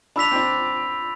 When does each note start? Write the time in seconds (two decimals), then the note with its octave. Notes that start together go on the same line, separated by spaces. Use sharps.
0.16 D4 B5 E6 B6 F7
0.31 C4
0.36 D4